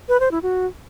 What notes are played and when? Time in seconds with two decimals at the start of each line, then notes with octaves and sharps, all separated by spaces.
0.09 B4
0.20 C5
0.31 E4
0.43 F#4